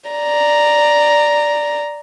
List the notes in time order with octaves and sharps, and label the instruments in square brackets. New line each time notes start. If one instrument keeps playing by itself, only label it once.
[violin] D5 A#5